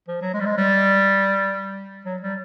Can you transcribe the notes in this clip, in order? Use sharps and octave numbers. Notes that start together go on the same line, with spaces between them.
F3
F#3
G#3
G3
G#3
G3
F#3
G3